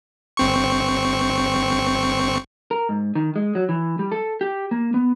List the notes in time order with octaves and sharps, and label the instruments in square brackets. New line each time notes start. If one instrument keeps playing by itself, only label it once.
[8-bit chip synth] G1 C4 C#6
[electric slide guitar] A#4
G#2
D#3
G#3
F#3
E3
G3
A4
G4
A#3
B3